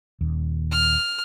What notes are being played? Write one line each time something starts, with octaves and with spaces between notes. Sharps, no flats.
D#1 D#2
F6